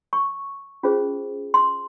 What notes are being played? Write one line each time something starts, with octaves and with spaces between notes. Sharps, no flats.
C#6
C#4 F4 G#4 C5
C6